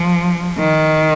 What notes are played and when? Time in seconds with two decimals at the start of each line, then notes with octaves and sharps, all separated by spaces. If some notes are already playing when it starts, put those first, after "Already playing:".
Already playing: F3
0.58 D#3